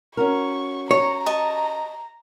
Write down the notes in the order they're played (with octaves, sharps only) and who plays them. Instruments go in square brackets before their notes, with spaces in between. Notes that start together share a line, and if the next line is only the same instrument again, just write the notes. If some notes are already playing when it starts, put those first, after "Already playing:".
[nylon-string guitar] C#4 F#4 A#4 [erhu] C#6
[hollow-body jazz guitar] C#5 [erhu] A#5
[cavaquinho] D#5 A5 C#6